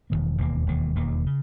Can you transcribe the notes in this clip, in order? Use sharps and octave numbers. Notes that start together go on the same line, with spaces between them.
E1 D#2 D#3 A#3
E1 D#2 D#3 A#3
E1 D#2 D#3 A#3
E1 D#2 D#3 A#3
C#3